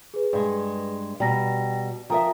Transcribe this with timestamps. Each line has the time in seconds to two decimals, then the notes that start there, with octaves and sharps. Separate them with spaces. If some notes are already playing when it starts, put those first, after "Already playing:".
0.14 G#4 B4
0.33 G2 G#3
1.20 B2 G3 G5 A#5 A#6
2.10 F3 A#4 E5 G5 A#5 D#6